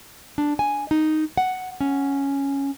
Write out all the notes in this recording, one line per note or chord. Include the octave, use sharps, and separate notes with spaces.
D4
G#5
D#4
F#5
C#4